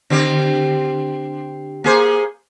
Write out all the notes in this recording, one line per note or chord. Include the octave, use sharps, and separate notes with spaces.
D3 C4 G4
A#3 G#4 C5